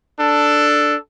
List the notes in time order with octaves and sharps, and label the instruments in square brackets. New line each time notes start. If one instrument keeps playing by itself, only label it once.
[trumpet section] D4 A4